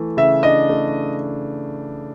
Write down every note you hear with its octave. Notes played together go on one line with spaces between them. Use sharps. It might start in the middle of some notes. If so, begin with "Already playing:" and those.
Already playing: E3 A3
C#3 E5
D4 D#5
A3